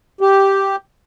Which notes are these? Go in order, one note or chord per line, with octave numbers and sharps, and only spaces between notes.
G4